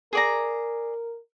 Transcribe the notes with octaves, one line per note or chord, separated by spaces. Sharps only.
G#4 A#4 D5 A#5